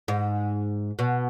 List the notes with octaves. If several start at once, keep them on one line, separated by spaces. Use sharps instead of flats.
G#2
B2